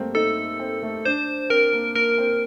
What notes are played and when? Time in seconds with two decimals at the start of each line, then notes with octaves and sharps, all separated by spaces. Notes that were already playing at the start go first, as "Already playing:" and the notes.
Already playing: G3 A3 A#3 C4
0.15 D#4 A4
0.60 C4
0.82 A3
1.05 D4 C5
1.50 C4 A#4
1.73 A#3
1.95 A#3 A#4
2.18 C4